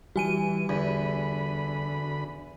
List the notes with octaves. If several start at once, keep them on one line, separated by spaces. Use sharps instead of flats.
E3 G3 F#4 G#5 D#7
E2 D3 B5